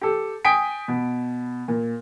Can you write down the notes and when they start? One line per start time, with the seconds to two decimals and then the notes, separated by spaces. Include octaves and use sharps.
0.01 G4 A4
0.45 G5 G#5 D#6 B6 D7
0.88 B2
1.68 A#2